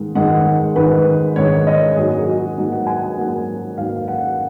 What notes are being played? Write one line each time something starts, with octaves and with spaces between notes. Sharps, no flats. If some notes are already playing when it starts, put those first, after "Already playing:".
Already playing: G#2 D#3 G#3
G#2 D#3 G#3 F#5
G#2 D#3 G#3 B4
G#2 D#3 G#3 C#5
D#5
G#2 F#3 A#3 G#4
F#4
G#2 F#3 A#3
F#5
G#5
F#5
G#2 F#3 A#3
G#2 F#3 A#3 F5
F#5